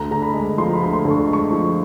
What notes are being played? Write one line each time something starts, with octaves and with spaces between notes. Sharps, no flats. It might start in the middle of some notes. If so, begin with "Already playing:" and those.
Already playing: D2 A#5
D3 A#5
B5
G#3
F3 C6
A#5
B5
D2
C6
D3
C#6
G#3
C#6
F3